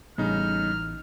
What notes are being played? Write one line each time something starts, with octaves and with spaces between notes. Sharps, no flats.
A1 C#3 G3 B3 D4 D#4 F6